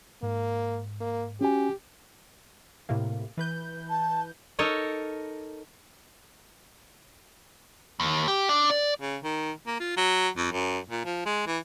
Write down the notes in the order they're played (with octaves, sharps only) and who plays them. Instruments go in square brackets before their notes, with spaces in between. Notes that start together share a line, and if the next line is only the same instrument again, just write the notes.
[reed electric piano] G#2 [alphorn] A#3
[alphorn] A#3
[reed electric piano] C#4 F#4 G#5 [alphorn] G4
[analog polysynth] A2 C3 A#3
E3 B4 G6
[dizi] A5
[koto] D#4 A4 A#4 C#5 D#5
[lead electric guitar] D#2
G4
D4
D5
[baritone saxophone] C#3
D#3
A#3
F4
F#3
F2
F#2
A#2
F3
G#3
E3